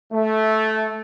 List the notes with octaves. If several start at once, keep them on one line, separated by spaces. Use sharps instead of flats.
A3